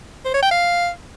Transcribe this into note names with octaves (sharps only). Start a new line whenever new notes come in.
C5
C#5
G5
F5